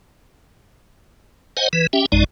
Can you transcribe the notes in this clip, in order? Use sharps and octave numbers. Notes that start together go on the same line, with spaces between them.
C5 D#5 F#5 G#5
E3 B4
C#4 G4 E5 G5
A1 F#2 G#3 D#4 D5